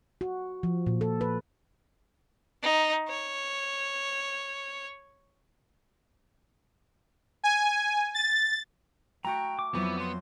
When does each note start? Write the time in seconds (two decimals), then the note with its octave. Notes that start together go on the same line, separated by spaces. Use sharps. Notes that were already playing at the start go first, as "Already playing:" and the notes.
0.21 F#4
0.63 F3
0.86 A#2
1.01 A4
1.21 B4
2.63 D#4
3.09 C#5
7.44 G#5
8.14 A6
9.25 A3 F#4 G5 A#5 C#6
9.59 D6
9.75 F2 F#3 B3 E4
9.99 C6